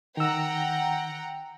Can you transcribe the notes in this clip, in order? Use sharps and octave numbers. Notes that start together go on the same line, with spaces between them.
D#3 F#5 G5 A#5 E6